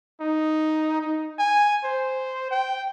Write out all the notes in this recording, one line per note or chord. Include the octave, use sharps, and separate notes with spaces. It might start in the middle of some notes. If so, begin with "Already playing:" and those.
D#4
D#4
G#5
C5
G5